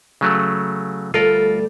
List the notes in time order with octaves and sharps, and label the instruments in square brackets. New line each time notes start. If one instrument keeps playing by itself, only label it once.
[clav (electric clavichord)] C#3 F#3 A3
[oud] D2 G3 A4 [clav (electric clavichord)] F4 A#4